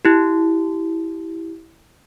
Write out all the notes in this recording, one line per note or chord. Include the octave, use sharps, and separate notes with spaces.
E4 G4